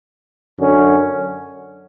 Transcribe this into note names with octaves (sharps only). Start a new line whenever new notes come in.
F#2 D3 F#3 C#4